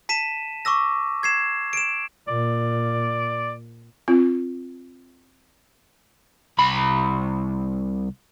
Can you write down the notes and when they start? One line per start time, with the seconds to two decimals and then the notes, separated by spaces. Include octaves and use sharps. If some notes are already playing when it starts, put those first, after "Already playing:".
0.09 A5 B6 D#7 E7
0.65 C#6 D6 E6 A#6
1.23 G#6 C7 E7
1.73 D7 E7
2.28 A#2 D5
4.08 C4 F4
6.59 C2 B5